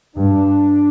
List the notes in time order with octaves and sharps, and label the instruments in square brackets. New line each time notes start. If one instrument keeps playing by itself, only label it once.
[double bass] G2 [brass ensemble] D4